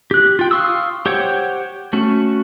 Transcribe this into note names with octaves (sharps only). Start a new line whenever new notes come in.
G4 F#6
F4 G5
F5 C6 C#6 D#6 E6
G4 C5 C#5 F#5 G5
A3 C#4 F#4